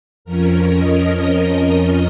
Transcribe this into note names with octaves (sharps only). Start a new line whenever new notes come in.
F2 F3 C#4 A#4
D#5